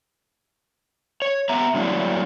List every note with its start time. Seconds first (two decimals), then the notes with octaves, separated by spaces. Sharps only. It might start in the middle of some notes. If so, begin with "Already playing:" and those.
1.22 C#5
1.49 B3 E5 A#5
1.74 A2 D3 F#3 A#3 D4 E4